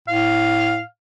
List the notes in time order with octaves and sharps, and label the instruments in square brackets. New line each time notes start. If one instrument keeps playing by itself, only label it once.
[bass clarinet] A2 [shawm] F5